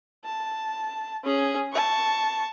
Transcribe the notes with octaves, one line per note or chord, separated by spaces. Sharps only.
A5
C#4 G#4
A5 C#6